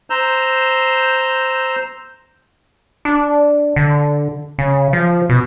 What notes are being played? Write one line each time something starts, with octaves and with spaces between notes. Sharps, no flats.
C5 A#5 E6 G6
D4
D3
C#3
F3
B2